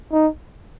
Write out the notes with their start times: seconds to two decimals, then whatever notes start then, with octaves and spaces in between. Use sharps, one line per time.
0.12 D#4